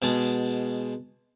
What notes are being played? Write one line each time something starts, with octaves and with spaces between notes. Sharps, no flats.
B2 G#3 A5